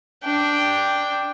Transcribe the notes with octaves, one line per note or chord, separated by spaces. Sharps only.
D4 G5